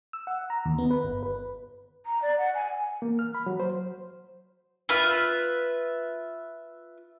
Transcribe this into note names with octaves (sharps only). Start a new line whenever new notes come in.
E6
F#5
A#5
D#2
B3
B4
G1
B4
A#5
D5
F#5
G#5
A#3
F6
B5
F#3
C5
F4 B4 E5